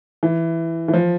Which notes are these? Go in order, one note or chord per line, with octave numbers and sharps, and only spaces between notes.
E3
E3
F3